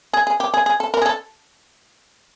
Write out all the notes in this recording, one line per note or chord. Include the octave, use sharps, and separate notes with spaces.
G#4
G#4
G4
G#4
G#4
A4
A#4
G#4
A4